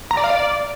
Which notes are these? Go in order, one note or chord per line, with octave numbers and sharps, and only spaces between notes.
A#5
D5
F5
D5